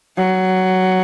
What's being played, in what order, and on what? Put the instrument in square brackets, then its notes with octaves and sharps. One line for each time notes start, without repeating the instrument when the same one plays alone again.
[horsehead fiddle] F#3